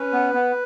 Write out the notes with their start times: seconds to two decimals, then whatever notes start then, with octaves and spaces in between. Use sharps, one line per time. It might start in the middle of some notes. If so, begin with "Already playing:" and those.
Already playing: C#4 B4
0.13 B3
0.34 B3